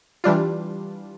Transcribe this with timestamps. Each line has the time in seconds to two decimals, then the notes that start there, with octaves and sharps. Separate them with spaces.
0.24 E3 G3 D4 F4